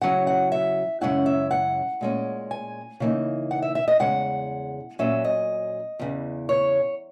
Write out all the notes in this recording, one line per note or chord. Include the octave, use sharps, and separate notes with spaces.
C#3 F#3 C#4 E4 F#5
F#5
E5
F#2 C#3 G#3 C#4 E4 F#5
E5
F#5
A#2 G#3 C#4
G#5
C#3 E3 A#3 D#4
F#5
E5
E5
D#5
E2 C#3 G#3 F#5
A#2 F#3 C#4 E5
D#5
E2 C#3 E3
C#5